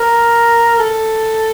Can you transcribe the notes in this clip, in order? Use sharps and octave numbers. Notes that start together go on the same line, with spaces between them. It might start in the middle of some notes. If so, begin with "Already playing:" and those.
Already playing: A#4
A4